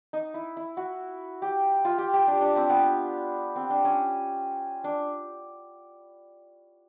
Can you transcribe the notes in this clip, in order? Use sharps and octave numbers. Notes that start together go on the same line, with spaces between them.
D#4
E4
E4
F#4
G4
F4
G4
G4
D4
D4
C4
B3
C4
D4
C#4
D4